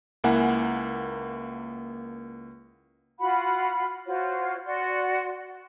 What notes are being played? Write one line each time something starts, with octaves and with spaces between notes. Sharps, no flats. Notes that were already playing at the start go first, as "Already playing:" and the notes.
C#2 A#3 E4 F#5 G#5
F4 F#4 F#5 B5
F4 F#4 C5 C#5
F#4 D5 F#5 C6